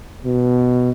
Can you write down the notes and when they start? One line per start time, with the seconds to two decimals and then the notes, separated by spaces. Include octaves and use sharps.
0.25 B2